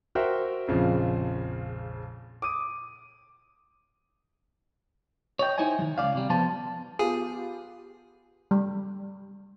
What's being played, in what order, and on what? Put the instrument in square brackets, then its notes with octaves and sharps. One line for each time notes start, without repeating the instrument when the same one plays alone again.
[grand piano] F#4 A#4 C5 E5 G5
A#1 F2 C#3 F3
D6 D#6 D#7
[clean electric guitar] C#5 D#5 G5
D#4 E4 C5 D#5 G#5
D#3 F#3
C#2 D5 F5
C3 G3
F3 G3 B3 C5 A5
[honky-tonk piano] B3 F4 G4 [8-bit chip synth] G#4
[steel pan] G3